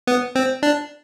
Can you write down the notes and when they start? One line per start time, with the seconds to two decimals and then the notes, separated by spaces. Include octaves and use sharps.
0.07 B3
0.35 C4
0.63 D4